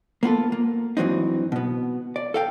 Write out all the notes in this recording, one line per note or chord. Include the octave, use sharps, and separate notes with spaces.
A#3 B3 F4 A4
A#3
G2 E3 F#3 C4 D#4
B2 B3
D5
A4 F5 G5